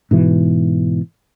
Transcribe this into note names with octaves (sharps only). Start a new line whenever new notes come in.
G#2 B2 E3